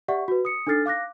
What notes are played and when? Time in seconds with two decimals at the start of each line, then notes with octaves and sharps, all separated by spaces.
0.08 G4 D5 E5 F#5 C#6
0.28 F#4 B4
0.45 D#6 C#7
0.67 D4 D#4 A4 F6 A6 C7
0.86 F5 D6 F#6 A#6